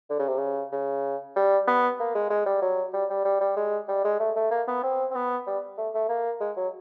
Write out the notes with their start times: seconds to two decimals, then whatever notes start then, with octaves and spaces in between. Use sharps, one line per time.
0.10 D3
0.19 C#3
0.28 C3
0.38 C#3
0.72 C#3
1.36 G3
1.68 B3
2.00 A#3
2.15 G#3
2.30 G#3
2.46 G3
2.62 F#3
2.94 G3
3.10 G3
3.25 G3
3.41 G3
3.57 G#3
3.88 G3
4.04 G#3
4.20 A3
4.36 A3
4.51 A#3
4.68 B3
4.83 C4
5.11 C4
5.15 B3
5.47 G3
5.78 A3
5.94 A3
6.09 A#3
6.41 G#3
6.57 F#3